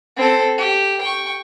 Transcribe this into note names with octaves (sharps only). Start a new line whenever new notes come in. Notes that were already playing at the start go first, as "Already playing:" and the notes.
C4 A4
G4
G5 C#6